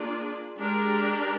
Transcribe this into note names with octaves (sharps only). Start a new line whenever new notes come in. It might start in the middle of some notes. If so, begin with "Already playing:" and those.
Already playing: A#3 D4 F4 G#4 D5
G#3 D4 G4 A#4 D5